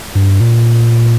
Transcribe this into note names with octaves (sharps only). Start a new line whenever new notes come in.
G2
A#2